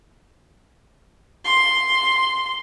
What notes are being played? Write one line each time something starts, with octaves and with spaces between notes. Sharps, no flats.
C6